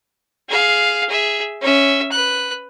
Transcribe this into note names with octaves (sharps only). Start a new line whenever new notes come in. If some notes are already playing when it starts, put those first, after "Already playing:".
G#4 F5
G#4 E5
C#4 E5
B4 F#6